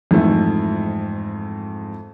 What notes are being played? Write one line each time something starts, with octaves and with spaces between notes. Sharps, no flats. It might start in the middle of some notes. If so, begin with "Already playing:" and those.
F2 G#2 E3 A3